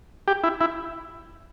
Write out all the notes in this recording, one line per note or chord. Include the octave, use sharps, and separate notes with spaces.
G4
E4
E4